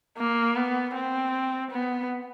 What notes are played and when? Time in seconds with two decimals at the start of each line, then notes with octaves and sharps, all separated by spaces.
0.18 A#3
0.56 B3
0.94 C4
1.71 B3